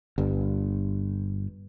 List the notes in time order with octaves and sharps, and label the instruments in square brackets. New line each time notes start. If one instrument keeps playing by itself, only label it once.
[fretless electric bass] G1 G2